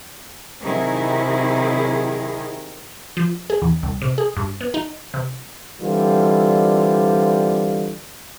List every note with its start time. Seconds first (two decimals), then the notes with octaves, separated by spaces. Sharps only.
0.62 C3 D#3 F#3 D#4 E4 G#4
3.17 F3
3.50 G#4
3.62 E2
3.83 C2
4.02 C3
4.18 G#4
4.37 G2
4.61 B3
4.74 D#4
5.14 C3
5.82 D3 E3 G3 C4 F4